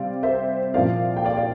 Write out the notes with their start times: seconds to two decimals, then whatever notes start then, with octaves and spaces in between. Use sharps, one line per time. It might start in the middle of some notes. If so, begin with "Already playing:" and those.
Already playing: C3 G3 C4 D5 F5
0.23 C5 E5
0.74 A#2 F3 C4 E4 D5 F5
1.16 G5
1.24 D5 F5
1.37 D5 F5